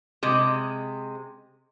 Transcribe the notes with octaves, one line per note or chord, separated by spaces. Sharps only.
C3 G#3